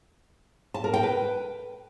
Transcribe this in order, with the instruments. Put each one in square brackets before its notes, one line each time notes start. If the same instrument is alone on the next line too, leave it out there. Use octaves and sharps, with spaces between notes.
[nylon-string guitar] A5
A#4
G5
B4